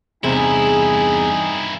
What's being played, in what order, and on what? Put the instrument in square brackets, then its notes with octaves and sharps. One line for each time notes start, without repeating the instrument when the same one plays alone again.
[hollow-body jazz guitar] E2 C3 [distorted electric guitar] G2 E4 [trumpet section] D#4 G#5 [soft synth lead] G#4